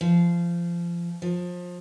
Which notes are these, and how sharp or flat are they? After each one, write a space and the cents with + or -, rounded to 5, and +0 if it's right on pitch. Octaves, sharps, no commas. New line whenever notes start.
F3 -25
F3 +25